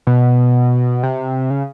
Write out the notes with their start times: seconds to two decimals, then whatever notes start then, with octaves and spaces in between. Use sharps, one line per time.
0.07 B2
1.03 C3
1.50 C#3